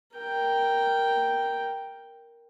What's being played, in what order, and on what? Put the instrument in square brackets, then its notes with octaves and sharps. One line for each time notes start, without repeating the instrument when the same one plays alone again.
[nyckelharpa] A#4 G5